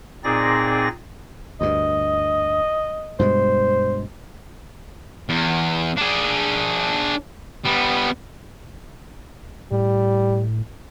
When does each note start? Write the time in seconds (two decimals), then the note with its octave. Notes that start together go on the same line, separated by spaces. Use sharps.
0.24 A#2 C4 D#4 G#4 D5 A#6
1.61 D2 G2 D#5
3.19 G2 B2 G#3 C5
5.30 E2
5.97 D4 G#4
7.65 G3 B3
9.71 A2 G3